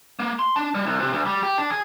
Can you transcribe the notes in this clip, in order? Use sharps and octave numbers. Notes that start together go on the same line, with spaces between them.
A#3
C6
D4
G3
C2
C3
D2
G3
G4
D4
G#4